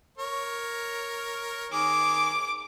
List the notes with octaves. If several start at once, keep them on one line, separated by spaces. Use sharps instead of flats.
A#4 C#5
D#3 G#4 D6